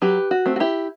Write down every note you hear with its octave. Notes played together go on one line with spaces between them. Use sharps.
F#3 G4 B4
F#4
A3 C4
F#4
E4 G4